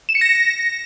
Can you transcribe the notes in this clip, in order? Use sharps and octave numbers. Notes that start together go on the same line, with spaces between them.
E7
C#7
A#6